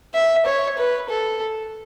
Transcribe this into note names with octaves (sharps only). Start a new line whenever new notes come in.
E5
C#5
B4
A4